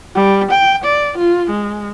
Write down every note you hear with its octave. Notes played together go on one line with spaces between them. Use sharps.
G3
G5
D5
F4
G#3